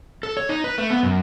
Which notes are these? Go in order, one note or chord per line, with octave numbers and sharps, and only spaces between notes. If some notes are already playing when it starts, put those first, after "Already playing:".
A4
C#5
D#4
B4
A3
B3
F#2